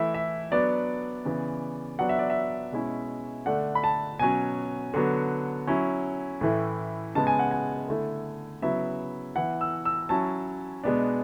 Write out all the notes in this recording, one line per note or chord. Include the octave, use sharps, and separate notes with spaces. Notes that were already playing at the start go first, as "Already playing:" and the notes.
Already playing: E3 A3 E4 E5
E5
F#3 B3 D4 D5
C#3 E3 B3
F#3 B3 D4 F#5
E5
D5
E5
B2 G#3 C#4 E4
D3 A3 D4 F#5
B5
A5
B2 F#3 C#4 G#5
D3 F#3 B3
F#3 C#4 E4
A2 E3 A3 E4
C#3 G#3 B3 A5
G#5
F#5
G#5
D3 A3 E4
C#3 F#3 B3 E4 E5
E3 B3 E4 F#5
E6
E6
F#3 C#4 E4 A5
B2 G#3 B3 D4